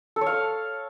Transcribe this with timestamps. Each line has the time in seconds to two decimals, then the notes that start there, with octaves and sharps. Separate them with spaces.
0.16 A4
0.21 C#5
0.26 F5